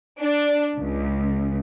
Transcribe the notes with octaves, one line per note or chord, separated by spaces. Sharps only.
D4
C#2